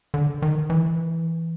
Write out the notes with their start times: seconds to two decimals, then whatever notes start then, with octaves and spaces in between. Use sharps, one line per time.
0.14 D3
0.42 D#3
0.70 E3